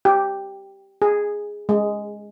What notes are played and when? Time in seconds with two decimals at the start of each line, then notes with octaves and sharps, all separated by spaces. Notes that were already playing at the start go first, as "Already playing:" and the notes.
0.05 G4
1.02 G#4
1.69 G#3